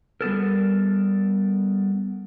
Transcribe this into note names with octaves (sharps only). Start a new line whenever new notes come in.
G3 B3 A4 A#4